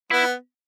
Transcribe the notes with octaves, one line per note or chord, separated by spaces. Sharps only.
B3 E4